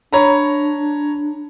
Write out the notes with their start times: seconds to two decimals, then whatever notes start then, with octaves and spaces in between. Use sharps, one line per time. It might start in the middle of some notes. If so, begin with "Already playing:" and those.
0.13 D4 C#5 A#5 B5